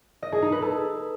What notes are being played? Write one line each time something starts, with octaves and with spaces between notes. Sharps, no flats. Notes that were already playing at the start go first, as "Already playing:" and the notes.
D#5
G#4
D#4
B4
A4